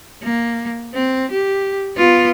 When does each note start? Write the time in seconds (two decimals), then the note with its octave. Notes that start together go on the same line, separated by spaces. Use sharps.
0.23 A#3
0.94 C4
1.31 G4
1.97 B3 F4